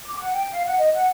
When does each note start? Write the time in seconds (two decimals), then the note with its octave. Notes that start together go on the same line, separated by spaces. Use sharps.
0.04 D6
0.17 F#5
0.34 G5
0.51 F5
0.65 F#5
0.78 D#5
0.92 F#5